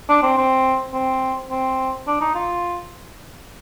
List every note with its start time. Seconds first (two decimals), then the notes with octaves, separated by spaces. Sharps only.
0.09 D4
0.23 C4
0.37 C4
0.94 C4
1.51 C4
2.07 D4
2.21 D#4
2.35 F4